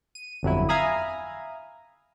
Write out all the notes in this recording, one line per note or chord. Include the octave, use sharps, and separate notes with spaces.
D#7
G1 F2 F#3 E4
E5 F5 G#5 A#5 B5 D#6